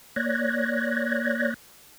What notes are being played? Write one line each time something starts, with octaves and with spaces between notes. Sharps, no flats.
A#3 C#5 D5 F#6 G#6 A#6